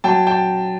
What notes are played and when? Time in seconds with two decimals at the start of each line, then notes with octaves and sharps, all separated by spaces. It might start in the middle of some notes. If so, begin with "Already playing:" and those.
0.04 F#3 G5 A5
0.27 G5 A5